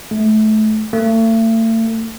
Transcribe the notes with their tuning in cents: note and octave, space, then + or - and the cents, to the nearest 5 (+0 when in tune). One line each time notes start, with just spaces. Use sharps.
A3 -25
A3 +40